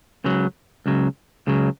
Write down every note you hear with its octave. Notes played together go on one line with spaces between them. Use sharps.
C#2 C#3 F#3
C#2 C#3 F#3
C#2 C#3 F#3